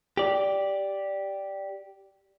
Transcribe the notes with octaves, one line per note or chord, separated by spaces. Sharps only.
G4 D5